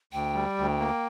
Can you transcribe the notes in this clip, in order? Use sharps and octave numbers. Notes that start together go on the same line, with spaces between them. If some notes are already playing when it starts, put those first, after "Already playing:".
D2 G5
G3
D2
A#3